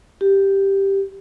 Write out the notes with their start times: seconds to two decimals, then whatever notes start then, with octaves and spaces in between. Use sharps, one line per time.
0.21 G4